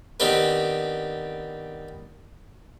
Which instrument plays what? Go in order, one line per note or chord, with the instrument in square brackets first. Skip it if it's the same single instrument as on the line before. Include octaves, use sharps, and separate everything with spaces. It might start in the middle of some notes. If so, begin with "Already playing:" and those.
[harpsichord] D#3 B3 C4 D4 G4 B4